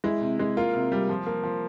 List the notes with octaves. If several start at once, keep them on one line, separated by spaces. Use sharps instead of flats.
G#3 E4
C3
G#3
A#3 F4
C3
G3
F3
A#3
F3